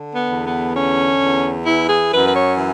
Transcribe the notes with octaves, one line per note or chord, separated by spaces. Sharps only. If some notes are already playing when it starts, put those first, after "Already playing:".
Already playing: D3
B3
E2
B3
D3 C#4
E2
E3 E4
G#4
F#2 B4
B4
C#5
E3